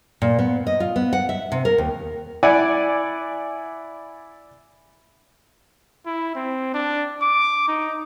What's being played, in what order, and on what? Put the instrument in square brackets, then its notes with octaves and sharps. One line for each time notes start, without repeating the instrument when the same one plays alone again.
[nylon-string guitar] A#2
B3
D#5
F4
B3
F#5
E5
C3
A#4
D#2
[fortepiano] E4 D5 F#5 G#5
[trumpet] E4
C4
D4
D6
D#4